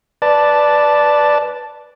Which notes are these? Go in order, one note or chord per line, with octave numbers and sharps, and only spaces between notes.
B4 D5 A5